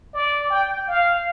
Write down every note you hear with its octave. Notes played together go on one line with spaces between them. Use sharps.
D5
G5
F5